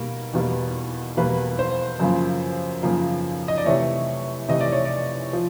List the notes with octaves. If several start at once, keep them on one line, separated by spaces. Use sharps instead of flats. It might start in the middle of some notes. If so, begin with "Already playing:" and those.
Already playing: B2 G3 A#3 A#4
E2 B2 G3 A#3
E2 B2 G3 A#3 B4
C5
F#2 C#3 F3 A#3
F#2 C#3 F3 A#3
D#5
D5
C3 E3 A3 C#5
C3 E3 A3 D#5
D5
C#5
D5
F3